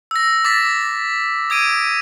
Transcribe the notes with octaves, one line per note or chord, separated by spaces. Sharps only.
E6 A#6
D6 A6 B6
D#6 G#6 D7 D#7